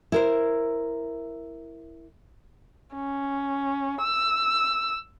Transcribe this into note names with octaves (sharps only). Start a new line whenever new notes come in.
E4 A#4 C5
C#4
E6